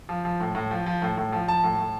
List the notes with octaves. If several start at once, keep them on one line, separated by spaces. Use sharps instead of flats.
F3
F3
A2
A2
F3
F3
A2
A2
F3
F3 A5
A2
A2